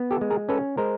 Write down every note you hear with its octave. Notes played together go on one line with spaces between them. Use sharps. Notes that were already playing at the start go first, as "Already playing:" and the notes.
Already playing: B3
G4 A4
G#3
G#4 A#4
C#4 A4 B4
G#3 A#4 C5